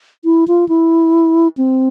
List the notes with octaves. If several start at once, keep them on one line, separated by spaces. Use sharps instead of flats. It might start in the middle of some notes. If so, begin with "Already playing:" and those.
E4
F4
E4
C4